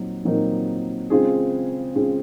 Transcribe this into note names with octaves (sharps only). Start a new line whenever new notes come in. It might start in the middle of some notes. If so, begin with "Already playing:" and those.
Already playing: A#2 F#3 C4 D#4
A#2 F#3 C4 D#4 A#4
C#3 G#3 C4 F4 G#4
C#3 G#3 C4 F4 G#4